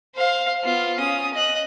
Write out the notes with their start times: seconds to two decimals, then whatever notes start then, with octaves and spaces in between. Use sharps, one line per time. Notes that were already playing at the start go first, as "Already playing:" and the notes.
0.15 C5 F5
0.63 B3 F4
0.98 C#4 D#6
1.34 D#5 F#6